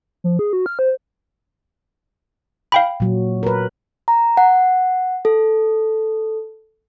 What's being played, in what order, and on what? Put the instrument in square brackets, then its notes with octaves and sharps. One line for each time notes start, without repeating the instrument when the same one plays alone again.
[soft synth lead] F3
G#4
F#4
F6
C5
[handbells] F5 G5 B5
[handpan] A#2 F#3
A#4 B4
[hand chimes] A#5
F#5
A4